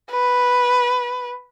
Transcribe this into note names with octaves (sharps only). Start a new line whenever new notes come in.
B4